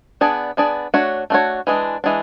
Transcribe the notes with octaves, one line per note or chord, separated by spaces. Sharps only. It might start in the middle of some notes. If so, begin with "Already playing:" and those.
B3 D4 G#4 D5
B3 D4 G#4 D5
A3 D4 F#4 C#5
A3 D4 F#4 C#5
E3 G#3 D4
E3 G#3 D4